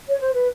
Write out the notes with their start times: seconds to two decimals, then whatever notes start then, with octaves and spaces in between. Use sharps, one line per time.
0.08 C#5
0.21 C5
0.34 B4